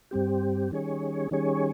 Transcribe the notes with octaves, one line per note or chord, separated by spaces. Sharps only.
G2 G3 C4 G4
D#3 G3 C#4 G#4 C#5
D#3 G3 C#4 G#4 C#5